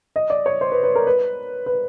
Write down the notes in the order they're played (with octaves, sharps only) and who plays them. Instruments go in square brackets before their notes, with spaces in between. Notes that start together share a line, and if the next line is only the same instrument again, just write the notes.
[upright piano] D#5
D5
C#5
C5
B4
B4
A#4
B4
B4